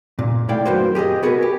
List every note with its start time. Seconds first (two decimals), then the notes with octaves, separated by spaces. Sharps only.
0.19 A#2
0.49 A3 E4 D5 F5 G5
0.65 F#2 D#3 A#3 F#4 B4 C5
0.95 G4 G#4 B4 D#5
1.23 B3 F#4 G#4 A#4 B4
1.42 G4